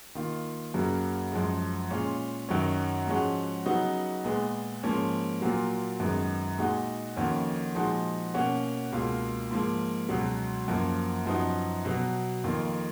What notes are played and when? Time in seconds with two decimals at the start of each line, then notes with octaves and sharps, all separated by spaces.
0.15 D#3 A#3 F4
0.74 F#2 C#3 F#3 A#3
1.32 F#2 F3 G#3
1.90 A#2 G#3 C#4 F4
2.49 F#2 D#3 F#3 C#4
3.07 G#2 F3 G#3 C#4 F#4
3.66 C#3 F#3 B3 D#4 F#4
4.24 A#2 G#3 B3
4.83 G#2 F3 A#3 C#4
5.42 A#2 F#3 A#3 F4
6.00 F#2 D#3 G#3 B3
6.58 A#2 G#3 D#4 F#4
7.17 F2 D#3 A#3 C#4 F#4
7.75 A#2 F3 G#3 D#4 F#4
8.34 B2 A#3 C#4 F#4
8.92 C#2 B2 A#3 F4
9.51 G#2 F3 A#3
10.09 C#2 B2 F#3
10.68 F#2 F3 A#3
11.26 F#2 F3 B3 D#4 F#4
11.85 B2 F#3 B3
12.44 F2 D#3 A#3 F4